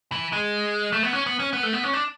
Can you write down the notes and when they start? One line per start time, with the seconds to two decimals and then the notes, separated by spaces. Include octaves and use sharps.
0.12 E3
0.32 G#3
0.93 A3
1.03 B3
1.13 C#4
1.26 B3
1.39 C#4
1.53 B3
1.63 A3
1.73 B3
1.83 C#4
1.93 D4